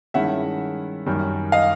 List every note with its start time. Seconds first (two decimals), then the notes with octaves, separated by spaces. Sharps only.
0.14 G2 D#3 G#3 C#4 E4 E5 F#5
1.06 F#2 D#3 G3
1.52 D#5 F5